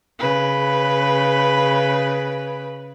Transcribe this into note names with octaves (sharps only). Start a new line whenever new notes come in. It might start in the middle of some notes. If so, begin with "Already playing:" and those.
C#3 B4